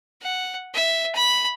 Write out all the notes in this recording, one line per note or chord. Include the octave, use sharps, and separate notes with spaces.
F#5
E5
B5